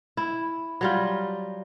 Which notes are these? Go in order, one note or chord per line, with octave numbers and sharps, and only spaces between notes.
E4
F#3 G3 F4